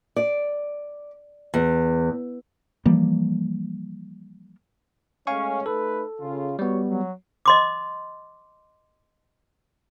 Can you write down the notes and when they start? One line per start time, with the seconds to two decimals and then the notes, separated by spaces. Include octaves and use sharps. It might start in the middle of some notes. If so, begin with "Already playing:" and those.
0.16 D5
1.54 E2
2.86 E3 F3 G3 A#3
5.27 G#3 A3 C#4 F5 G#5 C#6
5.66 A3 D#4 A4 B4
6.20 C#3 F4
6.59 G3 B3 F#4 G4 C#5
6.88 F#3
7.46 D#5 C6 D6